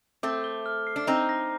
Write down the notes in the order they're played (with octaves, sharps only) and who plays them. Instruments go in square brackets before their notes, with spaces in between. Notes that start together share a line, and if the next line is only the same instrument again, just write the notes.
[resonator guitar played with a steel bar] A3 C4 [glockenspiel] D6
[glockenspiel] G7
F6
C7
[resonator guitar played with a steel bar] D4
[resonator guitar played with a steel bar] C4 D#4 [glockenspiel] A#5
[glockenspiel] A#6